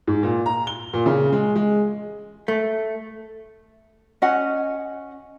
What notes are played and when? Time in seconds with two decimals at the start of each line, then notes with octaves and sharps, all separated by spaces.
0.07 G#2
0.23 A#2
0.46 A#5
0.67 G7
0.94 A#2
1.06 C#3
1.32 G#3
1.55 G#3
2.48 A3
4.22 C#4 D#5 F#5 G#5